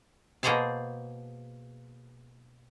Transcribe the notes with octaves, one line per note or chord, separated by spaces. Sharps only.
B2 A#3 G#4 C5 F5 A5